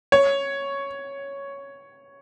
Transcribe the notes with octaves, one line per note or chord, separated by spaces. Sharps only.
C#5